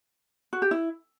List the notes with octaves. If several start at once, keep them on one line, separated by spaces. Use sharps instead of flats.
F#4
G4
E4